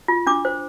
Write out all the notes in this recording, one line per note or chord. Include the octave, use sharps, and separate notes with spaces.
F4
D4 D6
C5